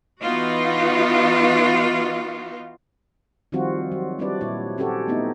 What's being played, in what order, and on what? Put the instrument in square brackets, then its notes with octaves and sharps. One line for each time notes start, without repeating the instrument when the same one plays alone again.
[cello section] E3 B3 D#4 F4 F#4
[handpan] D#3 F3 G3 C4 F4 F#4
F#3
G3 C4 D4 E4 B4 D5
A#2 E4 C#5
C4 C#4 F#4 G4 A4 C#5
A3 B3 C#4 D#4 E4